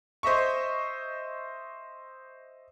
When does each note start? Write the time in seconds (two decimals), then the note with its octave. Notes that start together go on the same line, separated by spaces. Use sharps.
0.23 C5 D#5 E5 C#6